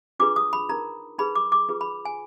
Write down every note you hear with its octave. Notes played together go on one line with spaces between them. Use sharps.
D4 F4 G#4 B4 D6
D#6
B5
D#4 A#4 A#5
D#4 G#4 B4 B5
D6
D6
F4 G#4 B4
B5
G#5